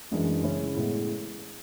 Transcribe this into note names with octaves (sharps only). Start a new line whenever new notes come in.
F#2 E3 G#3 D4
C#3 G#3 C#4 E4
A2 G#3 B3 E4